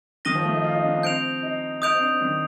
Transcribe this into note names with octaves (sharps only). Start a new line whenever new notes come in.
D#3 D#6 A#6 D#7 G7
F3
A3
D#4
F4
D#4
D4
D4
C4 G6 D7 F7
D#4
D#4 D#6 G6 D7 F7
C4
D4
D#3